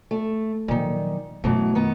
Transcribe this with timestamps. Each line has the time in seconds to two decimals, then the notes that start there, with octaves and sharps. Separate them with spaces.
0.11 A3
0.68 A#2 D#3 F3 F#3
1.44 F#2 B2 E3 F#3 A3
1.75 D#3 B3